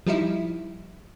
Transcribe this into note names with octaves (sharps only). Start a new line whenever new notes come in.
F3 G3 D#4 E4